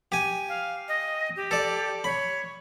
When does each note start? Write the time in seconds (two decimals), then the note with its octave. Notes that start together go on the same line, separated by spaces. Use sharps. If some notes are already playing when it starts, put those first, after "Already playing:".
0.12 G4 G#5
0.49 F5
0.88 D#5
1.36 G4
1.51 A4 D5
2.04 C#5 B5